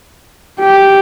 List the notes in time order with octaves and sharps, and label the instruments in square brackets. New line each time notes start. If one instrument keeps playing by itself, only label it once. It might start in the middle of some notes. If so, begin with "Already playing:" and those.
[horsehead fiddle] G4